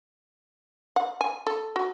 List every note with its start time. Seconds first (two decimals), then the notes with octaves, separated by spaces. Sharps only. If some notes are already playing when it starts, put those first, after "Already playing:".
0.96 F#5
1.21 G#5
1.47 A4
1.76 F#4